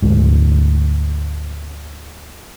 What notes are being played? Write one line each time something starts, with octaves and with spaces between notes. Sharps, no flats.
D2 G#2